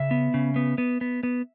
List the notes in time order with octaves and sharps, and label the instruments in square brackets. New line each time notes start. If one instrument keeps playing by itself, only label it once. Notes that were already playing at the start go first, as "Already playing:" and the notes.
Already playing: [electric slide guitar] C#3 E5
B3
C#3
B3
B3
B3
B3